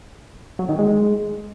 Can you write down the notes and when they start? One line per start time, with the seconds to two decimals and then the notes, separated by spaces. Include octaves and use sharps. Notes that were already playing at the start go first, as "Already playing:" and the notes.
0.59 F#3
0.69 D#3
0.79 G#3